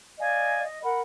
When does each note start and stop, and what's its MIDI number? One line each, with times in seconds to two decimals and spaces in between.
0.19 0.62 74
0.19 0.62 75
0.19 0.62 77
0.19 0.62 80
0.63 0.82 75
0.82 1.00 70
0.82 1.00 78
0.82 1.00 83